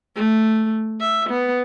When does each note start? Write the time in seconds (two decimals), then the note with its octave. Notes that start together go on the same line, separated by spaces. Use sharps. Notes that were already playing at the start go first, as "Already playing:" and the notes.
0.16 A3
1.00 E5
1.29 B3